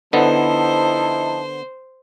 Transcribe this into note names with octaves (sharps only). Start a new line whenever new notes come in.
D3 F3 B3 D#4 E4 C5 A5